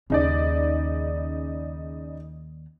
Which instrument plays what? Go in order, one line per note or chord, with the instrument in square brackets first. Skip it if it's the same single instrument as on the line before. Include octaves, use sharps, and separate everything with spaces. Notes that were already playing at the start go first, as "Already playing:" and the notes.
[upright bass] D#2 [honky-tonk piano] C#3 D#4 D5